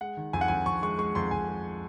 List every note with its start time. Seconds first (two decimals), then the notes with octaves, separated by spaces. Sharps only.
0.01 G#3 F#5
0.17 D#3
0.33 F2 G#5
0.41 F#5
0.48 F2 G#5
0.66 F2 C#6
0.82 G#3 C#6
0.98 G#3 C#6
1.15 F2 C6
1.31 F2 G#5
1.49 G#3